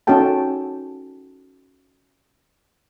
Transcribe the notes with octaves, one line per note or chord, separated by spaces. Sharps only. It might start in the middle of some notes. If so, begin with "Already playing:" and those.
C#4 D#4 F#4 A4 G5 A5